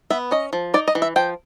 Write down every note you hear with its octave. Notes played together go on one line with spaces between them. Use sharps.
B3 E5
C#4 D#5
F3
D#4 D5
D#5
E3
E5
F3 G5